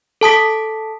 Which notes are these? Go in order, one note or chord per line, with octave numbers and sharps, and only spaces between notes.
A4 A5 D#6 B6